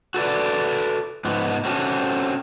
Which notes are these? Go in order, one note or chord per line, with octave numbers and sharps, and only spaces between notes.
F#4 A4 B4 D5
G#2 F3 B3
C4 C#4 F#4 G4 A4